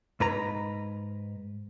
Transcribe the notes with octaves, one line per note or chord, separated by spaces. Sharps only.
G#2 B4 A#5